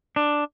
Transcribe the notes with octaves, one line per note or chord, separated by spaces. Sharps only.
D4